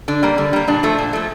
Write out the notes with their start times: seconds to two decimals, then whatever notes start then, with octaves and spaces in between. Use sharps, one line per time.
0.08 D3 D4
0.23 G3 A#3
0.38 D3
0.53 G3 A#3
0.68 A#2 D4
0.83 F3 A3
0.98 A#2
1.13 F3 A3